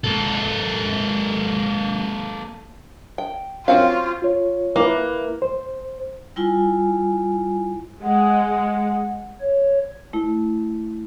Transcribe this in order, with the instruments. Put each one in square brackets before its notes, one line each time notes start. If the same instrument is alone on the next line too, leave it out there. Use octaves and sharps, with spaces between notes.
[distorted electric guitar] A#3 A4
[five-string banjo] G5
[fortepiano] C4 C#4 [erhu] F4 [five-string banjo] F#4 F5
[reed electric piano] F4 C#5
[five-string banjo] A#3 [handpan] E4 B4
[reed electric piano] C5
[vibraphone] G3 E4 F4 G#5
[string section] G#3 [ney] F#5
[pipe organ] C#5
[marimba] A3 E4